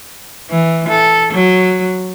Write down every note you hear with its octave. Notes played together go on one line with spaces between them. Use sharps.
E3
A4
F#3